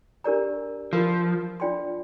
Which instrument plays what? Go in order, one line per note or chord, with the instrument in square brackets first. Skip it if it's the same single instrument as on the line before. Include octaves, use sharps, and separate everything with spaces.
[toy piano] D4 G4 A#4 D5 A#5
[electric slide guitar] F3 [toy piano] F4 A#4 F5
[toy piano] D4 F4 D5 G5 C6